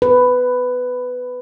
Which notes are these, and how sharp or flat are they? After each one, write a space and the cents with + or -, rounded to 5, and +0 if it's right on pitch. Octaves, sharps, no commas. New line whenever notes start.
B4 +10